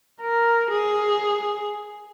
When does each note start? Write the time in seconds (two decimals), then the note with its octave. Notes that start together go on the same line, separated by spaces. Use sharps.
0.21 A#4
0.71 G#4